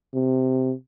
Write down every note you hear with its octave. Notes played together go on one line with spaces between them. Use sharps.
C3